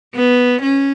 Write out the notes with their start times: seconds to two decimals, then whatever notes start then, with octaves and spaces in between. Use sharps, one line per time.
0.15 B3
0.63 C#4